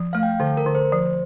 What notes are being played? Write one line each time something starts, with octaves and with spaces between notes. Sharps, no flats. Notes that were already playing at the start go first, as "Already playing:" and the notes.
Already playing: F3
A3 F5
G5
D3 A4
A#4
D3
C5
F3